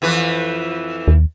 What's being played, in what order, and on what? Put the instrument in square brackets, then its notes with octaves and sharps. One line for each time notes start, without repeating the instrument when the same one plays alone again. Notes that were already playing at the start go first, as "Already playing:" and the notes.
[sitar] F2 E3 B4
[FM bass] D#2